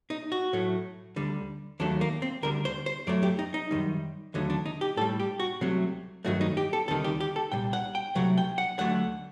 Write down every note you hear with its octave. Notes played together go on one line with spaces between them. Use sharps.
D#4
F#4
A2 F#3 A3
D2 D3 G3
D#2 D#3 F#3 A3 D4
A#3
C4
D2 D3 G3 A#4
C5
C5
F#2 F#3 A3 D5
G4
D#4
D#4
F#2 D#3 G3
D#2 D3 F#3 A3 D#4
D4
D#4
G4
A2 G3 A4
G4
F#4
C2 C3 F#3 A3
G2 D#3 F#3 A3 F#4
D#4
G4
A4
D2 C3 D#3 G3 A4
G4
G4
A4
C2 A#2 G3 G5
F#5
G5
C2 C3 F#3 A3 F#5
G5
F#5
D2 D3 F#3 A3 F#5